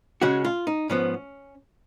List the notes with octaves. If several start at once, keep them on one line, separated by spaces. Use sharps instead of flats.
C#3 G#3 C#4 F#4
F4
D#4
G#2 F3 B3 C#4